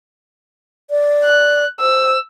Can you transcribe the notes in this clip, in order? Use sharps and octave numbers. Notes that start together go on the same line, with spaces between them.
D5
F#6
C5 E6